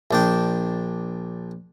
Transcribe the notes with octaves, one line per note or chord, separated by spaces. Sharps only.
A#1 D4 G5